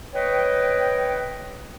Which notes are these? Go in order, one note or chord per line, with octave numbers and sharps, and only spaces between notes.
B4 C#5 D#5 G5